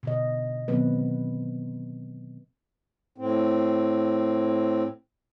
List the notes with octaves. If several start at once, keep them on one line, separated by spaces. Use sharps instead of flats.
B2 D3 D#5
B2 D#3 F#3 B3 C4 B4
A2 C4